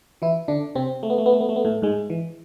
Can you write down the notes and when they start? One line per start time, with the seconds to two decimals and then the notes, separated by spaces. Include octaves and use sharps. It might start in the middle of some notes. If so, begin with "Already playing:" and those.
0.22 E3 E4
0.48 D3 D4
0.75 C3 C4
1.03 A3
1.10 B3
1.18 A3
1.26 B3
1.33 A3
1.41 B3
1.49 A3
1.56 B3
1.65 A2 A3
1.82 G#2 G#3
2.10 E3